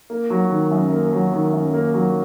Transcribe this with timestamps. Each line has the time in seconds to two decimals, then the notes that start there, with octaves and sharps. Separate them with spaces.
0.10 A#3
0.30 F#3
0.51 D#3
0.71 F#2
0.91 A#3
1.12 F#3
1.33 D#3
1.53 F#2
1.73 A#3
1.94 F#3